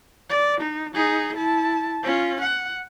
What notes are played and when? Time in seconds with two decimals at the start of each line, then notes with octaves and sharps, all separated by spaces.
0.29 D5
0.61 D#4
0.95 D#4 G#4
1.36 E4 A5
2.03 C#4 F4
2.41 F#5